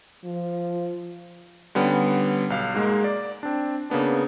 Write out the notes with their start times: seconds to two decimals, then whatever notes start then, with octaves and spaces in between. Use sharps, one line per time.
0.24 F3
1.75 D3 G3 B3 C#4
2.50 B1 F5
2.74 G#2 G#3 A#3
3.04 D5
3.43 C4 D4
3.90 C#3 A#3 B3 D4